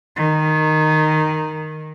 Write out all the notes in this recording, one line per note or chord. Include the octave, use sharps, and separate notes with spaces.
D#3